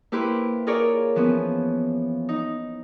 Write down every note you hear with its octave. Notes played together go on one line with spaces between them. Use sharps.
A#3 E4 G4 B4 C5
F4 G#4 A#4 C#5 D5
E3 F3 B3 C#4
D#4